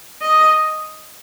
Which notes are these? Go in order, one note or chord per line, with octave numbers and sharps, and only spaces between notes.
D#5